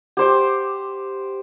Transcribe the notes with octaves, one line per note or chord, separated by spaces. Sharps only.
G4 C5 D6